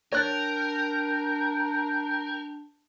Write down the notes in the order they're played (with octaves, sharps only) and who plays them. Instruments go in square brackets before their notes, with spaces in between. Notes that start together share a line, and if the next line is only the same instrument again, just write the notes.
[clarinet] D4 [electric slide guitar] A#4 [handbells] C#5 F#6 A6 [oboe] G5